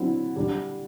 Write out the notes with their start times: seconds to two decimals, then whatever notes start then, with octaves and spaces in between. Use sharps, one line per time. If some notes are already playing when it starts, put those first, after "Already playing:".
Already playing: D3 F#3 C4 E4
0.36 D3 G3 D4